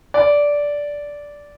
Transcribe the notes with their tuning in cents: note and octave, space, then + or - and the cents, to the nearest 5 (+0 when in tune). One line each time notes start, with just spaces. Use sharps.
D5 -10